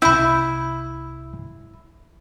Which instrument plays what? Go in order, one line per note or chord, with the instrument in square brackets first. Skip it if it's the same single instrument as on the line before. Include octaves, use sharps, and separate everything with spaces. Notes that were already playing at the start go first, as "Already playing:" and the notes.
[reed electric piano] C2 E6 [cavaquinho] E4 [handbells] B5 G6